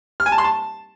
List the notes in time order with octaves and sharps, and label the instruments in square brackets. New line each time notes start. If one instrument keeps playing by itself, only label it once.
[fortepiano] F6
G#5
A5
C6
A5